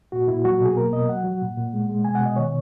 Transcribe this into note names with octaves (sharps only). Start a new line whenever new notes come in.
A#2 F#4
A#2 E4
F#3 F#4
B2
G#4
A#3 A#4
B2 D#5
F#3 F#5
F#3
A#2
A#2
G#3
G#3
B2 G#5
F#5
B2 D#5
D#3 C#5